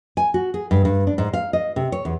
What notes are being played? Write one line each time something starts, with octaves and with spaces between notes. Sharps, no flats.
G#5
F#4
G#4
G2
G2
D4
G#2
F5
D#5
C3
C#5
E2